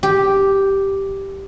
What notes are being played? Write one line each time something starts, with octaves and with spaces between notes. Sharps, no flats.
G4